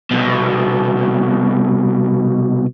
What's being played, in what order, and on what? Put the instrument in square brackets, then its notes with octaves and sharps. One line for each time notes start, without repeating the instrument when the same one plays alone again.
[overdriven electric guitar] C2 B2